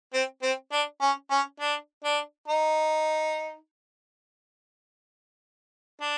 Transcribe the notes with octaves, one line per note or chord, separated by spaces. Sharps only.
C4
C4
D4
C#4
C#4
D4
D4
D#4
D4